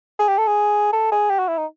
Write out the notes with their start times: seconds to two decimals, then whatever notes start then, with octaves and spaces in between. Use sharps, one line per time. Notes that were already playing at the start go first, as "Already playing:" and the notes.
0.19 G#4
0.28 G4
0.38 A4
0.47 G#4
0.93 A4
1.12 G#4
1.30 G4
1.39 F#4
1.48 E4
1.58 D#4